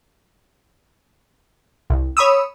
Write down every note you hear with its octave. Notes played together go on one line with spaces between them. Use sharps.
C2
C#5 B5 D#6 E6